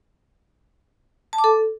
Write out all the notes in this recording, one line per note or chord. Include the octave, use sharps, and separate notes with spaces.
A5
D6
A4